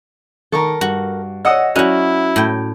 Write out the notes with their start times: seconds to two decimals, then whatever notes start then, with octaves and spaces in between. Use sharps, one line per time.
0.52 D#3 A4 A#4 C#6
0.81 G2 F#4
1.45 C#5 D#5 F#5 D#6 E6
1.76 F#3 C#4 E4 F#4 D5 F#6
2.36 A2 G5